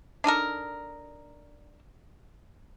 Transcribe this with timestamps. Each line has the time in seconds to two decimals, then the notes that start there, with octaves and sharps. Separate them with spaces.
0.24 D4 D#4 A4 A#4